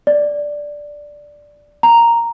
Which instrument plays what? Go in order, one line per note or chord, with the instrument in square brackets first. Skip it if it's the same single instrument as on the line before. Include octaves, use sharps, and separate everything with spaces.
[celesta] D5
A#5